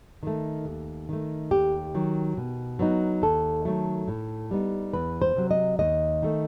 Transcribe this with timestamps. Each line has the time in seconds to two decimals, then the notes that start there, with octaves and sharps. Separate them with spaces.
0.23 D#3 A3
0.65 D#2
1.09 D#3 A3
1.51 D#2 G4
1.94 D#3 F#3
2.37 B2
2.79 F#3 B3 D#4
3.22 D#2 A4
3.65 D#3 F#3 A3
4.08 A2
4.51 G3 B3 D#4
4.93 E2 B4
5.22 C5
5.36 C3 F#3
5.51 D#5
5.79 D#2 D#5
6.22 D#3 A3